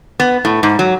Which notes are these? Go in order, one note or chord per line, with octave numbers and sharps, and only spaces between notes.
B3
A2
G#2
F#3